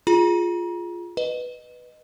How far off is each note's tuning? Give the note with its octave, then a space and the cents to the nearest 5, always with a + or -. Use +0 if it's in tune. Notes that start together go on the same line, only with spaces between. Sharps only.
F4 +0 G#4 +0 A#5 +35
B4 +0 D#5 -20